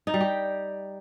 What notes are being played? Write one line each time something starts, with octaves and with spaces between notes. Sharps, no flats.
D#4
G3
G4